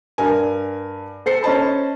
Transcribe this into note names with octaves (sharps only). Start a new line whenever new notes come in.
G2 A#4 G#5
A4 C5 C7 C#7
C#4 C5 D#5 A5 B5